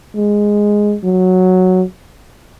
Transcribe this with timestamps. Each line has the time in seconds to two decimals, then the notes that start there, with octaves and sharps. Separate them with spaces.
0.16 G#3
1.04 F#3